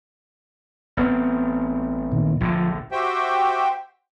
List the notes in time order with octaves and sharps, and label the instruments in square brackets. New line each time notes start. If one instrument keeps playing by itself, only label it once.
[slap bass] A1 B3 C4
[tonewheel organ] A#2 D#3
[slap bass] A#1 A2 D3 [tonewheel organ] F3
[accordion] F#4 G4 C5 E5 G5